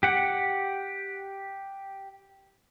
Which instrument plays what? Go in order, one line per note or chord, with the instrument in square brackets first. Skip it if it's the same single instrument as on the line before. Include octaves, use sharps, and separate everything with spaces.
[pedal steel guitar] G4 F#5